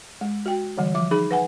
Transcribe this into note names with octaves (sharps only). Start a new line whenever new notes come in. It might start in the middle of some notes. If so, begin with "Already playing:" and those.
G#3
F#4 G5
D3 E3 G3
F3 D6
D#4 G#4 B5
B4 F#5 G#5